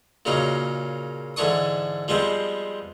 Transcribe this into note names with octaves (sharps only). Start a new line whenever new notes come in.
A#2 C#3 F#3 A#3 D#4
G#2 D3 E3 D4 C#6 D#6
F3 G3 G#3 B3 C4